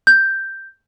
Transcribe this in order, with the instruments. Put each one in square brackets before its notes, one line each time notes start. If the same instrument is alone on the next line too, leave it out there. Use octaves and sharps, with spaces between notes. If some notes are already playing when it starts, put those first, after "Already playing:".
[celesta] G6